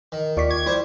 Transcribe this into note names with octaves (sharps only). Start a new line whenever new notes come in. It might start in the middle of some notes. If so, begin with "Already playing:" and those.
D#3
D#2 F4 D5 C#6 B6
G#6
G3 E4 C5